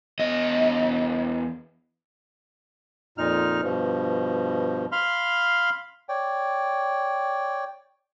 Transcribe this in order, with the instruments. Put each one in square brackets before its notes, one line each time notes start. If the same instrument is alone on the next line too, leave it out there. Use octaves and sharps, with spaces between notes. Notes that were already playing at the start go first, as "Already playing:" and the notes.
[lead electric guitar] E2 D#5
[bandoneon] F2 A#2 D#4 F6
G2 B2 F3
F5 B5 C6 F6
[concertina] C#5 D5 G5